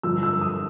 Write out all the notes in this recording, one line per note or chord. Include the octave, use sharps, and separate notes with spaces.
G2 D3 F3 E6
E6
D#6